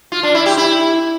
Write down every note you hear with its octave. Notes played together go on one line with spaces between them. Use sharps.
F4
D4
E4
G4
E4